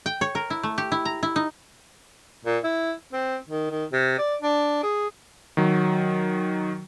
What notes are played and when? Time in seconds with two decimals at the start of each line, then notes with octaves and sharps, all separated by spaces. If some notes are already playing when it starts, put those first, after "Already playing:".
0.06 G5
0.21 C#5
0.35 A#4
0.50 E4
0.63 A3
0.78 G4
0.92 E4
1.05 A#5
1.23 E4
1.36 D#4
2.45 A#2
2.64 E4
3.13 C4
3.49 D#3
3.70 D#3
3.93 C3
4.18 D5
4.42 D4
4.83 G#4
5.57 D#3 F#3